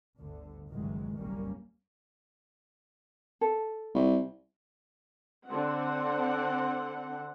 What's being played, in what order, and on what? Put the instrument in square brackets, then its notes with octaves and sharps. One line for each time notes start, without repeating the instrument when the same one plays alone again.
[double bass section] G1 D2 D3
G1 C#2 D#3 E3 F#3 G#3
F#1 B1 G3 A#3 C#4
[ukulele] A4
[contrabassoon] C2
[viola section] D3 C4 F#5